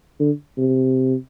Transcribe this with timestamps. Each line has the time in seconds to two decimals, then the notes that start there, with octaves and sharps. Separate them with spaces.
0.20 D3
0.58 C3